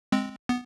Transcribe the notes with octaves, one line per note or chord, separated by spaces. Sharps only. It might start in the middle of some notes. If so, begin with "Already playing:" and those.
G#3 C4
B3